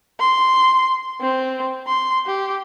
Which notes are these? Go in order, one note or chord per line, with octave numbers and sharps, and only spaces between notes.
C6
C4
C6
G4